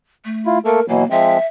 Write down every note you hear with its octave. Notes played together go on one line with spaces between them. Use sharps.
A3
E4 F4
A3 A#3 A4 A#4
B2 E3 F#3 A#3
F3 G#3 C4 E5